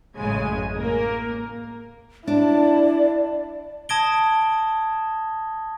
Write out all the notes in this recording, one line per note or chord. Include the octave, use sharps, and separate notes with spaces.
A1 F#2 C#3 G#3 G#5
A#3 A#4
D4 E4 D5 A5
A5 D#6 G#6 A#6 D7 G7